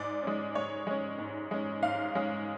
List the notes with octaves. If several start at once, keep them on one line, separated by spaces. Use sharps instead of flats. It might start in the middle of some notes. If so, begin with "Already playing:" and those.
Already playing: G#2 D5
G#3 C#4
G#2 C#5
G#3 C#4
G#2
G#3 C#4
G#2 F5
G#3 C#4